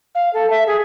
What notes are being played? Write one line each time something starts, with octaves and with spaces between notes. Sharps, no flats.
F5
A4
E5
G#4